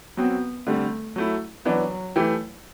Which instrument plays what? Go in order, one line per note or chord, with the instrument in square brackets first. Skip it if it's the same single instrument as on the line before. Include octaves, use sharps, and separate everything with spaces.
[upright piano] F#3 C4 F#4 [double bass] B3
[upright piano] D3 G3 C4 [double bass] A3
[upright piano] F#3 A3 E4
[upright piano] E3 B3 D4 [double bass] F#3
[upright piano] E3 A3 E4 G4